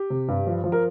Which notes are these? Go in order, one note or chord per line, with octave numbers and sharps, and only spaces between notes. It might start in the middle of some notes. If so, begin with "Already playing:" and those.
Already playing: G4
C3
G2
F3
F3
A#4